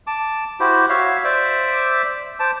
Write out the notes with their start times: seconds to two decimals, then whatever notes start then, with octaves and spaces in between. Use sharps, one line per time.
0.07 A5 D6
0.60 E4 F#4 G4 C5
0.89 F#4 C#5 E5 F5
1.24 C5 D5 E5 D6
2.39 C5 A5 D6